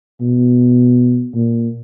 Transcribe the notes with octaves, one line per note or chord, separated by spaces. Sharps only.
B2
A#2